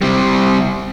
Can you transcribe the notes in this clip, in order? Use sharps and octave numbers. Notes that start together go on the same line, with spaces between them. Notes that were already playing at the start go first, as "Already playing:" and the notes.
C3 G3